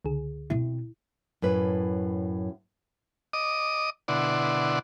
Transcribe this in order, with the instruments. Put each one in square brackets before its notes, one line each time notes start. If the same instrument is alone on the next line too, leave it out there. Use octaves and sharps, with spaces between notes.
[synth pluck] C#2 D3 G#4
[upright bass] B2 C4 [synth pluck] E4
[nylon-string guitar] F#2 A2 B4
[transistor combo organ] D#5 D6 D#6
B2 D3 E4 D5 F#5 C6